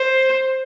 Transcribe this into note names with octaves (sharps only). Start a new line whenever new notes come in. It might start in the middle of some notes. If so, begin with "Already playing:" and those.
Already playing: C5